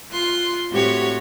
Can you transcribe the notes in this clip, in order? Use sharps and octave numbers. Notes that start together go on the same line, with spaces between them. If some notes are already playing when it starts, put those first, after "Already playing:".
F4 C6 F#6
A2 C4 F#4 G4 C#5 F#5